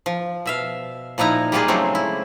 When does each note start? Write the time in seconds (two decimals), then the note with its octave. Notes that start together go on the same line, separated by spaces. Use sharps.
0.06 F3
0.46 B2 E5 F5
1.18 A#2 F3 D#4 E4 A#5
1.52 G3 G#3 A#3 F4 G4 G#4
1.68 C#3 F#3 G#3 A3 C4
1.95 E4